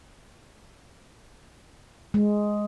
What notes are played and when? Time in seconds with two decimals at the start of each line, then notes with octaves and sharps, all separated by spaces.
2.14 G#3